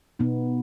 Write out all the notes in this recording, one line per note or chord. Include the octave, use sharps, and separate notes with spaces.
B2 B3 D#4